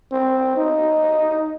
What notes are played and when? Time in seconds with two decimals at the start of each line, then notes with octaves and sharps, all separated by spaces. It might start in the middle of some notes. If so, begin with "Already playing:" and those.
0.12 C4
0.57 D#4